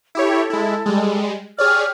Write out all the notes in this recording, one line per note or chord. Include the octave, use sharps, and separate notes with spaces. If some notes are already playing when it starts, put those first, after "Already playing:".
E4 G4 A4 C#5
G#3 E4
G3 G#3
G4 G#4 C#5 D5 F6